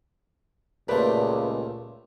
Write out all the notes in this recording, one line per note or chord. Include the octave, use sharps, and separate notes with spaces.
C#2 A#2 A3 G4 B4 C5 D5